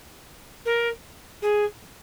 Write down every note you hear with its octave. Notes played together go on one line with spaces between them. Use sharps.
A#4
G#4